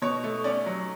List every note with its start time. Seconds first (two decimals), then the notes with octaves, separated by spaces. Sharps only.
0.02 B2 C#5
0.24 A3
0.44 C#4 D5
0.66 F#3